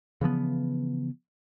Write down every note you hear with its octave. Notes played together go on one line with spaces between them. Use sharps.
C#3 E3 F3 B3